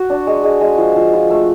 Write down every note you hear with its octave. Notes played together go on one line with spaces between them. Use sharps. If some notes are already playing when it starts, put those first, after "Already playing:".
Already playing: F#4
D4
G#3
G#3
G#3
F3
F3
F4
A3